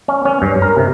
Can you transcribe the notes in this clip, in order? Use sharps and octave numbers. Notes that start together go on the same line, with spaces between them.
C#4
C#4
G2
A#4
C3